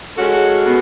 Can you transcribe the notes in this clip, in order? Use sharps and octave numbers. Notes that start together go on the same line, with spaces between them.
G#3 C#4 F#4 A4
B2